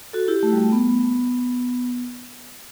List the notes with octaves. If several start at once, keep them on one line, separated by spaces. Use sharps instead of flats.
F#4 A4
E4 G4
A3
G3
A3
B3